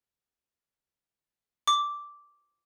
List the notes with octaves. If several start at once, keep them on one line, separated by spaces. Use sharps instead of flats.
D6